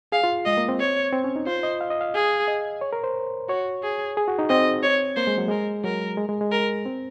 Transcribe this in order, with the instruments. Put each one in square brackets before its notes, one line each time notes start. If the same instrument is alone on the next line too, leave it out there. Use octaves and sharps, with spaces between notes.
[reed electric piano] G#4 [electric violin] F5
[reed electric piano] F4
[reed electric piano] G#3 [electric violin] D#5
[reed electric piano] A#3
C4
[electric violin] C#5
[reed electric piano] C4
C#4
D#4
[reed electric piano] F4 [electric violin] C5
[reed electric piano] D#5
F5
D#5
F5
[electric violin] G#4
[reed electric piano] D#5
C#5
A#4
C5
[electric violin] F#4 [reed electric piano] C#5
[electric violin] G#4
[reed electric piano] G#4
F#4
D#4
[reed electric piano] C4 [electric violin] D#5
[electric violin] C#5
[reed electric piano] A#3 [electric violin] C5
[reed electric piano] G#3
F#3
[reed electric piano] G#3 [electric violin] A#4
[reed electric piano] F#3 [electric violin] A#4
[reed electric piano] G#3
G#3
G#3
[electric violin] A#4
[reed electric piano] C4